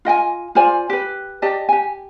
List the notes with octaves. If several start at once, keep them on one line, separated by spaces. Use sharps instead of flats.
F4 D#5 G5 G#5
F4 C5 D5 G#5
G4 B4
G4 D5 D#5 A5
G4 G#5